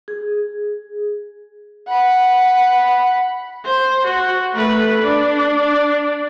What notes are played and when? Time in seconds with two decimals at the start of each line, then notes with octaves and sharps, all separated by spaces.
0.08 G#4
1.88 F#5 B5
3.65 C5
4.05 F#4
4.54 A3 B4
5.02 D4